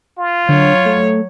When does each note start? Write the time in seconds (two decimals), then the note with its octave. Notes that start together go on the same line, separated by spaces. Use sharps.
0.19 F4
0.49 D3 F#3 C#5
0.85 A3